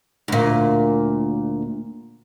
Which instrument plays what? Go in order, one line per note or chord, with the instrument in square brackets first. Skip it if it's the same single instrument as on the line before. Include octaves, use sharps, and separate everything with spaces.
[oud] D2 A#2